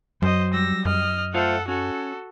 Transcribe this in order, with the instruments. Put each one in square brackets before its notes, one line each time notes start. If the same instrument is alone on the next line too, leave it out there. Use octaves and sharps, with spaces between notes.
[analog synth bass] F#2 [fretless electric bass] F#3 [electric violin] C5 D#5
[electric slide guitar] G3 [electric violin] E6 A#6
[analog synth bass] F#2 [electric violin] D#5 F6
[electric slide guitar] A3 F4 C5 [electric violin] A4 F#5
[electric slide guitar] C#4 [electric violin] F#4 A4